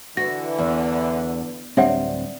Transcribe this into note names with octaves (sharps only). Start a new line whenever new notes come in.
D3 E3 F#4 A#6
E2
D1 G3 C4 D4 C#5 E5 F#5